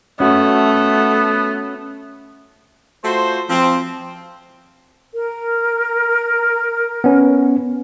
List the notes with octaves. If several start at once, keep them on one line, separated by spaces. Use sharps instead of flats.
A3 B3 C#4 F#4
A3 F4 F#4 C5
F3 C4
A#4
B3 C#4